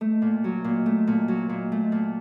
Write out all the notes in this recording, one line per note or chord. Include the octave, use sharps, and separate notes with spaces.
A3
A#2
F#3
A#2
A3
A#2
F#3
A#2
A3
A#2